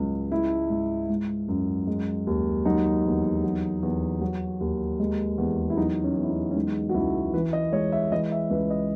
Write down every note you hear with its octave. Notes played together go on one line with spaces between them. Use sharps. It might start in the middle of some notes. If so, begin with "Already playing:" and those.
Already playing: C#2 G#2 F#3 G#3
G#3 E4
G#2
G#3
F#2
G#3
D#2
F#3 D#4
E2
F#3
E2
F#3
D#2
G#3
E2
E4
F#3 D#4
C#4
E2
E4
D#4
C#4
G#3 D#4
F#4
C#2 E4
E3 B4
D#5
G#3 C#5
E5
E3 D#5
E5
C#2 B4
D#5